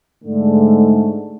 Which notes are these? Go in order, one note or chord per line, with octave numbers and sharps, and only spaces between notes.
G#2 D3 A3